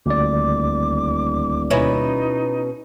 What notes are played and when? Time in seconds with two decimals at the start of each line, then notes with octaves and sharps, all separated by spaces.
0.06 D#1 D2 D5 D6
1.70 B2 C#4 D#4 E4